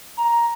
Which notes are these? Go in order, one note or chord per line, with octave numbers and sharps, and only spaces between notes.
A#5